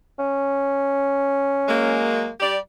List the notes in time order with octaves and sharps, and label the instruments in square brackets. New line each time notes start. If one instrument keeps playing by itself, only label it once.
[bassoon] C#4
[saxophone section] F#3 G#3 A#3
G3 G4 D5